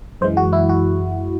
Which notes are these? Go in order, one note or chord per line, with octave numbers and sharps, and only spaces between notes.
F#2 E3 G#3 C5
F#4
E4
F#4